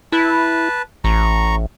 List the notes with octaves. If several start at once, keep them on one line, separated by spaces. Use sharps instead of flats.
E4 B4 A5
A1 A#5 C#6